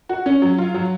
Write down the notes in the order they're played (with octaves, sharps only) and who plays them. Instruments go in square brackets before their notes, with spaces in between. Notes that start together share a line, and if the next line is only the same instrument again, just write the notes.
[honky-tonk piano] F#4
C#4
F#3
F4
F#3